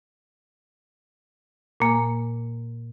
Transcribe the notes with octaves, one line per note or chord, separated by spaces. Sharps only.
A#2 A#3 G#5